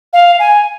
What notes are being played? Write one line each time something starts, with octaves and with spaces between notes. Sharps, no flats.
F5
G#5